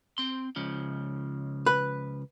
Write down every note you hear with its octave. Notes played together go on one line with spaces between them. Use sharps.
C4 C6
C#2 C#3 F3
B4